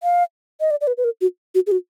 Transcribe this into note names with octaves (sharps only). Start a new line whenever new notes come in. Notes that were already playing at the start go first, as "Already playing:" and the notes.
F5
D#5
D5
D5
B4
B4
A#4
F#4
F#4
G#4
F#4